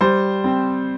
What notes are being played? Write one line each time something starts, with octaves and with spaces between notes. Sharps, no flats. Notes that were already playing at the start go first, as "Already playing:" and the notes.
G3 C5
C4